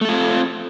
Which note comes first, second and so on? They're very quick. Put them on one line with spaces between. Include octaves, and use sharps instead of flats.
A3 A4 F4 C4